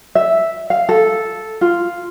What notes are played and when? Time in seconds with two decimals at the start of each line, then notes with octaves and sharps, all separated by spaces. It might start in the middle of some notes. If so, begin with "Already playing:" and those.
0.15 E5
0.70 F5
0.89 A4
1.61 F4